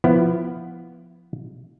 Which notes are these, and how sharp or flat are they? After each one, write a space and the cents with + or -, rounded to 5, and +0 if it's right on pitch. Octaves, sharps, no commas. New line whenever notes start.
F3 +0 B3 +0 E4 +15